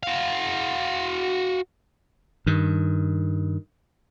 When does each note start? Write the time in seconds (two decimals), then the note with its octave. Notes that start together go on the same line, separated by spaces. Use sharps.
0.03 F#4 F5
2.46 G2 D#3